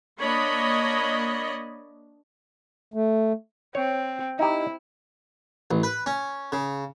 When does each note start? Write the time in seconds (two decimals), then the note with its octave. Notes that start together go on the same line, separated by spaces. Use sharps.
0.19 A#3 D4 C#5 D#5 B5
2.94 A3
3.75 C4 C#5
4.39 D#4 E4 G4
5.71 A1
5.83 B4
6.06 C#4
6.52 C#3